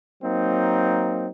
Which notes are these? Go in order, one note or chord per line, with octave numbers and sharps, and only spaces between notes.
F#3 A#3 C4 D#4